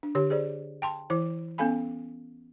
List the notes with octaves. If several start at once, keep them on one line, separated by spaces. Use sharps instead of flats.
D4
D3 G4 C#5
G#4 C5 D5
G5 A5 C6
E3 E4 C5
B3 C#4 A4 F5 G#5 B5